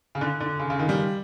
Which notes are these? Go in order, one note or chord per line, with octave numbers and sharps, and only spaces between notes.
C#3
D3
D3
C#3
C#3
D#3
G3